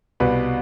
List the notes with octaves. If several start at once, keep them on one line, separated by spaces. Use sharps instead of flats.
C2 B2 G3 B4